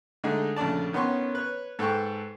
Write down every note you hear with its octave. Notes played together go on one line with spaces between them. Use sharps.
D3 G#3 A3 D4 D#4 G#4
A#1 C#3 A3 D4 D5 A5
D#3 B3 C#4 C6 C#6
B4 C#5
G#2 A4 B4 G5 C#6